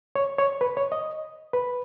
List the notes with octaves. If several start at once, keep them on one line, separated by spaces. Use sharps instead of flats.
C#5
C#5
B4
C#5
D#5
B4